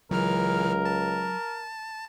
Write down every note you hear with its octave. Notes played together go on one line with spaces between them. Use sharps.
C#2 C#3 E3 F#3 A#4 F6
A5